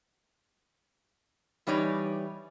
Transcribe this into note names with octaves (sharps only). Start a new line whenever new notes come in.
E3 G3 D#4 C#5 D5